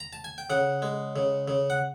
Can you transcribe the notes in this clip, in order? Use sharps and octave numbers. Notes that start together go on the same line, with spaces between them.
A#5
A5
G#5
G5
C#3 F#5
G#3
C#3
C#3
F#5